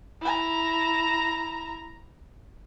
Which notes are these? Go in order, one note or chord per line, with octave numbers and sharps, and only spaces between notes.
E4 A#5